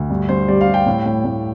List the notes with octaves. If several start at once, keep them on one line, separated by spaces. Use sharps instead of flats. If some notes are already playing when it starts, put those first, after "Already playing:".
Already playing: D2
G2
G2 C5
G3 D5
F5
G3
G5
A2
A2
A2